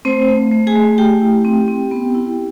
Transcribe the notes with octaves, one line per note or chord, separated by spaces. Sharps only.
A3 C4 C5
A3
A3
G#4 G#5
A3
A3 G4 G5
E4
C4
C4
B3
E4